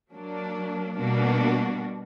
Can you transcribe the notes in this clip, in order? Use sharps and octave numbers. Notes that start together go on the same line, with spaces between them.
F#3 A#3 D4
B2 G3 A#3 D4 F#4